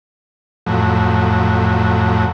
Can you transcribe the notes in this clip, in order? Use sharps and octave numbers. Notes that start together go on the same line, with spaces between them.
F2 A2 F#3